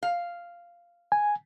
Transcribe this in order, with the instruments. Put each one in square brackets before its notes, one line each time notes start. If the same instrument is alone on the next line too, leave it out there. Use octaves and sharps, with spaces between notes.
[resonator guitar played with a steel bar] F5
[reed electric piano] G#5